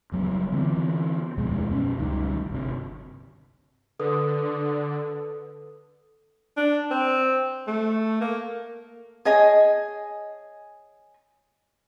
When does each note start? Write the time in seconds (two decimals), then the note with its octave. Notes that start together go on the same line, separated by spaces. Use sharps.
0.12 F#1 F#3 G3 B3
0.52 D3 E3 B3 C4
1.38 D#1 F2 B2 G#3
1.70 F#2 B2 C#4
1.97 F#1 C#2 D#3 G3
2.51 G1 C3
3.99 D3 A4 B4 D#6
6.57 D4
6.91 C4
7.67 A3
8.21 A#3
9.25 G#4 C#5 D#5 G#5